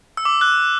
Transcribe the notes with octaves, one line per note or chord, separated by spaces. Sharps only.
E6
D6
F#6